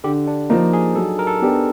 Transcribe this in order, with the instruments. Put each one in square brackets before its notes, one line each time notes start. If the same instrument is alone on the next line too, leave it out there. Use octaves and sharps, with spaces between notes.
[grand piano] D3 [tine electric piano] G4
[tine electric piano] D4
[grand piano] F3 A#3 [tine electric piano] D#4
[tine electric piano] G#4
[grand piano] F#3 [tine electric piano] A4
[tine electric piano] A#4
A4
[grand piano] B3 D4 G4